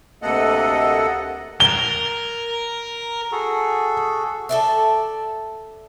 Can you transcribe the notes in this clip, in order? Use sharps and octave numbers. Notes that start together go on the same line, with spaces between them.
D2 C3 A#3 A4 D#5 F#5
A#4 G7
F#4 G#4 A4
A4 D5 E5